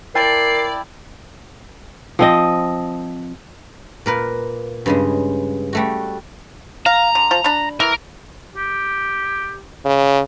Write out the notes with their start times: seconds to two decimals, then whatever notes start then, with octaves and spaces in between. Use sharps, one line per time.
0.15 E4 A#4 D5 G5 A5 C7
2.19 F3 C4 D#5
4.06 A#2 A#4 B4
4.86 G2 C#3 G#3
5.73 G3 A3 F#4
6.86 F5 A#5
7.15 D3
7.31 F3
7.44 D4 B5
7.80 E3 A#4
8.56 G4
9.85 C#3